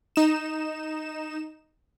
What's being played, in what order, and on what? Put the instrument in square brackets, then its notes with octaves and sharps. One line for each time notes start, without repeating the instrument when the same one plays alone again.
[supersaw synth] D#4 E7